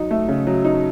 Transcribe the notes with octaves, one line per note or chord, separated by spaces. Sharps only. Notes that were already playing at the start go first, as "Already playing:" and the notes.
Already playing: F#3 D#4
A3
C#3
F#3
D#4